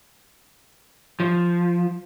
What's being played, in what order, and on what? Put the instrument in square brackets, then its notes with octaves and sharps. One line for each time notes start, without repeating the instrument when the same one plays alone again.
[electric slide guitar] F3